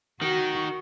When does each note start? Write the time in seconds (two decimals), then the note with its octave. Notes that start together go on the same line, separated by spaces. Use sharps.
0.21 D#3 F#4